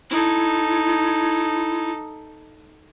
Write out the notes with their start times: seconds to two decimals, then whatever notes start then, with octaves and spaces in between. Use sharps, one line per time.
0.10 D#4 E4 A4